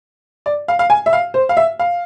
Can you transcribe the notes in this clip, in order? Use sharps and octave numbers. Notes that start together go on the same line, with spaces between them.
D5
F5
F5
G#5
E5
F5
C5
F5
E5
F5